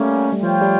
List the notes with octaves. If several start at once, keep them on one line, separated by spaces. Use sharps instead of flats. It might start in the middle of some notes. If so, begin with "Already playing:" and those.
Already playing: G3 A3 A#3 C#4
G3
F3 F4 C#5 G5
G3